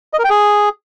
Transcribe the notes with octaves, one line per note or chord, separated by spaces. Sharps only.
D#5
A#4
G5
G#4